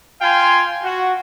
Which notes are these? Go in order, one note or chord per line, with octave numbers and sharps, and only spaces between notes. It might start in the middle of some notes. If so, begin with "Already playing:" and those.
F4 F5 G5 G#5 C6
F#4